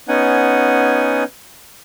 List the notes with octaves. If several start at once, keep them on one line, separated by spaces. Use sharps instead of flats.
B3 C#4 D#4 F#5 G#5